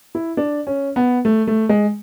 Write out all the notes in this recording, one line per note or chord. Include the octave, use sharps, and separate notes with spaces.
E4
D4
C#4
B3
A3
A3
G#3